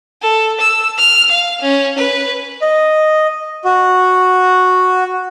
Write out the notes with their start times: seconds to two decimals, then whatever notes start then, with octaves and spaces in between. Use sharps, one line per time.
0.22 A4
0.60 E6
0.98 F6
1.31 F5
1.61 C#4
1.98 B4
2.62 D#5
3.65 F#4